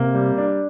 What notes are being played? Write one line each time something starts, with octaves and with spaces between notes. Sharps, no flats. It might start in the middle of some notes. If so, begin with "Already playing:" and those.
Already playing: C3 A#3
G3
D4